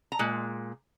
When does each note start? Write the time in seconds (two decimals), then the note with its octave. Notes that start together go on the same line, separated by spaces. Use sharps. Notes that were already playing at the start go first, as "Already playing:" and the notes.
0.12 A#5
0.19 A#2 G#3